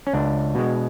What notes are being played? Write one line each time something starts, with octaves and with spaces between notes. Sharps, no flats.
C#4
C#2 D4
B2 G#3